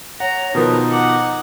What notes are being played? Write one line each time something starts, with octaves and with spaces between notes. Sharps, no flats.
C#5 F#5 A#5
B2 D#3 F3 D#4 A#4 B4
F#5 D6